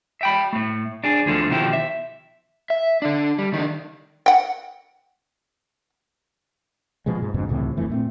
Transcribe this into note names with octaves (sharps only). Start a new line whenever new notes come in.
E5 G5 B5
A2 A3
D4 G#4
D2 D3 F3 A3
B2 D#3 F3 E4 G4
E5
E5
D3 D4
G3
D#3 D4
F#5 G5
B2 F3 G#3
G#2
F2 G#2 B2 D3
C#2 A2 C3 E3
D1 F2 E3 A3
A#2 A3 C4